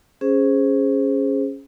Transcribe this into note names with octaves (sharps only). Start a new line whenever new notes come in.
C#4 G#4 C5